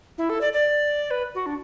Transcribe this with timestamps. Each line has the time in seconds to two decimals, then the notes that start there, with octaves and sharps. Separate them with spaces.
0.18 E4
0.30 A4
0.41 D5
0.53 D5
1.11 B4
1.35 F#4
1.46 D4